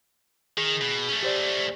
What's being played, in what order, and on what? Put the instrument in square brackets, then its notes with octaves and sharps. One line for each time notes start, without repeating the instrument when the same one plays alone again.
[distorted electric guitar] D#3 [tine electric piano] G#4
[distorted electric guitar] B2
A3 C#4
[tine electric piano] G4 C5 D5